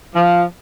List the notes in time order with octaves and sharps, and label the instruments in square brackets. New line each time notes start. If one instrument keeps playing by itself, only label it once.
[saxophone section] F3